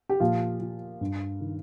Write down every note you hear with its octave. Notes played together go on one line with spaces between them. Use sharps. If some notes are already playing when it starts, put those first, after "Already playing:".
G4
A#2 F3 F4
F3
G2
D#3